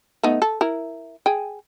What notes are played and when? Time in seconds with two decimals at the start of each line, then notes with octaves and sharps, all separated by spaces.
0.23 A3 B3 D#4
0.42 A4
0.61 E4 A#4
1.26 G#4 G5